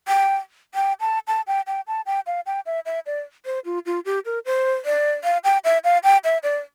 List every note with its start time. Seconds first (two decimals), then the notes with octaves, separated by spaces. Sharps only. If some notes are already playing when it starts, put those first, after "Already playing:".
0.08 G5
0.75 G5
1.00 A5
1.28 A5
1.47 G5
1.67 G5
1.87 A5
2.06 G5
2.27 F5
2.46 G5
2.66 E5
2.86 E5
3.06 D5
3.46 C5
3.65 F4
3.86 F4
4.06 G4
4.25 A#4
4.46 C5
4.85 D5
5.24 F5
5.44 G5
5.64 E5
5.84 F5
6.04 G5
6.24 E5
6.43 D5